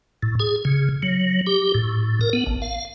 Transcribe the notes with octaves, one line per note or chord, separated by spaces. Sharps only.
A2
G#4
C#3
F#3
G4
A2
A#4
B3
A1
F5